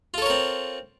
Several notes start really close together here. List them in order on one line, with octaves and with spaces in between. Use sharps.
F4 A4 C#5 A#4 C4